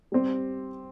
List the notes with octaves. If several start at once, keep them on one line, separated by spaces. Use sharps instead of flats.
G3 C4 G4